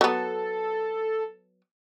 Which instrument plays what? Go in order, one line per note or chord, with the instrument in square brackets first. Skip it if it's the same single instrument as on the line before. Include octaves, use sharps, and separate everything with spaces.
[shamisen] F#3 B3 [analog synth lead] A4